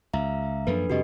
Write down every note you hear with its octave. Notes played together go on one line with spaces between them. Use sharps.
C#2 E5 F5 A#5
F#2 F3 A#3 D4 A4 B4
F2 C3 G3 F#4 G4 D#5